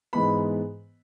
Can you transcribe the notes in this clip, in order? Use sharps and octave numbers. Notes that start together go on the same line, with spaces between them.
G#2 E3 G#3 B3 B5